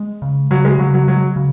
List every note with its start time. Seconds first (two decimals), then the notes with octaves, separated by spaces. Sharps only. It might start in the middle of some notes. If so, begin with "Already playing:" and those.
Already playing: G#3
0.22 C#3
0.51 C#3 F#3
0.65 G#3
0.78 C#3 F#3
0.94 F#3
1.08 F#3 G#3
1.36 C#3